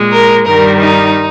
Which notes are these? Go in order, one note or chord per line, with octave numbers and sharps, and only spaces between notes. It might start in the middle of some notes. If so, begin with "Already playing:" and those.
Already playing: A#2 G#3
A#4
G2 D#3 G3 A#4
D#4